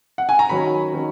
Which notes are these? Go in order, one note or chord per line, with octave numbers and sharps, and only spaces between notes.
F#5
G#5
A#5
D#3 F#3 C#4 B5
D#3 F#3 C#4